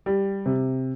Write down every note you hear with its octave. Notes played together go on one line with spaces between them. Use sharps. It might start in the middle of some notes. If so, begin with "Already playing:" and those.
G3
C3